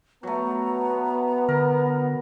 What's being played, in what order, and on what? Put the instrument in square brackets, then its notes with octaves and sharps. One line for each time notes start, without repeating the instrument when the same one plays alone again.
[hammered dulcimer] F#3 A3 [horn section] B3 [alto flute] A#5
[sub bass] D3 [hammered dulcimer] A#4